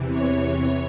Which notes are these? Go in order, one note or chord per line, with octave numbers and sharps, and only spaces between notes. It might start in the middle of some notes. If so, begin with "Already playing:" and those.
Already playing: E2 C3 E3
C#5